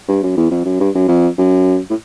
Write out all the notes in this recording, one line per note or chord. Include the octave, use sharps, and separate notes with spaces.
G2
F#2
E2
F2
F#2
G2
F#2
F2
F#2
A2